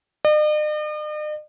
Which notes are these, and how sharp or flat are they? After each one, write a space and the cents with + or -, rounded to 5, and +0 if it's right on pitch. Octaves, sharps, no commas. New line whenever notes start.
D#5 -45